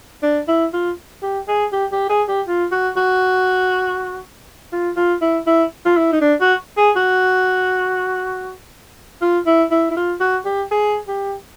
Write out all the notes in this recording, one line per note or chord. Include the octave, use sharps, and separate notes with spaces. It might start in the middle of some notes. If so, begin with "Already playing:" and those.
D4
E4
F4
G4
G#4
G4
G4
G#4
G4
F4
F#4
F#4
F4
F4
E4
E4
F4
E4
D#4
D4
F#4
G#4
F#4
F4
E4
E4
E4
F4
F#4
G4
G#4
G4